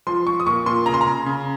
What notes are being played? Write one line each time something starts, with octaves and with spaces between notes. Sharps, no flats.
F3 C6
F3 C#6
D#6
A#2 C#6
A#2 C6
C#3 A#5
C6
A#5
C#3
C#3